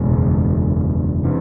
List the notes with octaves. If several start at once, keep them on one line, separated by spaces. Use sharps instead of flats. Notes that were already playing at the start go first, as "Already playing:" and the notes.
Already playing: F#1 E2 B2 G#3
C3 E3